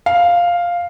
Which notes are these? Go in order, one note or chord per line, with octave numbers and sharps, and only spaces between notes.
F5